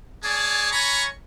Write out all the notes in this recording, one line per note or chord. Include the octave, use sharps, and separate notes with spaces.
A#3 G#4 C#5 D5 G#5 A5
F4 C#5 G#5 A#5 B5 C#6